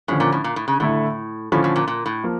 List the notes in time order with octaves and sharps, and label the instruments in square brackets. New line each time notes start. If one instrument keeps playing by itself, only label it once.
[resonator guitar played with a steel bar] A2 [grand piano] D3 F3 C#4
[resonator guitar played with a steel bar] A#2
A2
A#2
A2
C#3
[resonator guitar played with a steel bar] A2 [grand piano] D3 A3 E4
[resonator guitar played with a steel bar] A2 [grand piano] D3 F3 C#4 F4
[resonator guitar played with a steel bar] A2
A#2
A#2
A2
[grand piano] F3 A#3